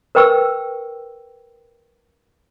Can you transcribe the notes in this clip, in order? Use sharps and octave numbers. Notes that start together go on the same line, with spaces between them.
A#4 B4 G5 C#6 E6